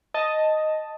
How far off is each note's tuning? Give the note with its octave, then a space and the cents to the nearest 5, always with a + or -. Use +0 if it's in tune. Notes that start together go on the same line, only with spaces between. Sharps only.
D#5 +0 A5 +0